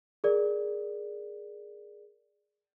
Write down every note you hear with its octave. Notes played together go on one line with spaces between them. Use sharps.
G#4 A#4 D5